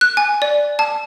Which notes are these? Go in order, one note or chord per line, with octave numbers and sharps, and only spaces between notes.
F#6
G#5
D5
A5